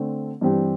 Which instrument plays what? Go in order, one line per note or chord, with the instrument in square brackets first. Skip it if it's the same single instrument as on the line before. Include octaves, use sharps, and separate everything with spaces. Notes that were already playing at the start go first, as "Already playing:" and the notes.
Already playing: [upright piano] D3 A3 C4
G2 E3 G3 C4 G4